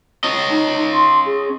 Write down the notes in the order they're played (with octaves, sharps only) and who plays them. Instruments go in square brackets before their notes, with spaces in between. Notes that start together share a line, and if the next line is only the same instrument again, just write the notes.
[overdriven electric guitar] C#4 D#5
[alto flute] D#4
C6
G#4